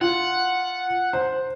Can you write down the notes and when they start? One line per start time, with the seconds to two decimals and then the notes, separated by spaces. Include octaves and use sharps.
0.01 F4 F#5
1.13 C5